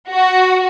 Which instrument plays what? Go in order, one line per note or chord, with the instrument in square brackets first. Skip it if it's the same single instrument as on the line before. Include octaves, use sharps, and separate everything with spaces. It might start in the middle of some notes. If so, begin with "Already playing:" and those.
[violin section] F#4